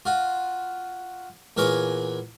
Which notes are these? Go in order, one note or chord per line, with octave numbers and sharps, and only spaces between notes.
F4 F#4
E2 A#2 A#4 B4 C#5 G#5